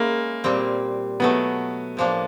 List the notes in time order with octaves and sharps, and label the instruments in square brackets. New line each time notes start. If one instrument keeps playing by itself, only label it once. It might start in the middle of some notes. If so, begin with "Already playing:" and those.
Already playing: [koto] G#3 C#4 E4 [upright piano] A#3
[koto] A#2 G3 C4
[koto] B2 F#3 A3 [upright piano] B3
[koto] A2 F3 A#3 D4